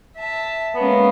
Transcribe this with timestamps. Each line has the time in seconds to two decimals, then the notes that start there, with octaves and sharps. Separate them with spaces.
0.16 E5 A5
0.75 G#3 A#3 B3 C#4